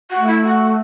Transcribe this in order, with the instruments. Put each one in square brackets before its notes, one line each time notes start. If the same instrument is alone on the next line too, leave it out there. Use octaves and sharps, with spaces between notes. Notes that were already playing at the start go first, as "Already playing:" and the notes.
[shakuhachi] F#4
[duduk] A3
[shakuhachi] E4
F#4